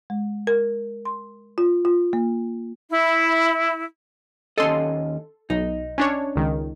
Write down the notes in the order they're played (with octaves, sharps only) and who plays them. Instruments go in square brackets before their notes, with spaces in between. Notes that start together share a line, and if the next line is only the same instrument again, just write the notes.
[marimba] G#3
A#4
C6
F4
F4
A#3
[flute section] E4
[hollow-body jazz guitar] D#2 C#4 D#5 [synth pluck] A4 C6
[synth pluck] B1 [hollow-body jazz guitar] D#4
[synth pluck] C#4 D4 C#5
C#2 D#3